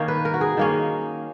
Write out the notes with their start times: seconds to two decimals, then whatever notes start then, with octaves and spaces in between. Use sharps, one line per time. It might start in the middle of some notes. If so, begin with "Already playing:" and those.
Already playing: D#3 A#3 C#4
0.08 B4
0.25 A#4
0.34 F#4
0.41 G#4
0.57 D#3 A#3 C#4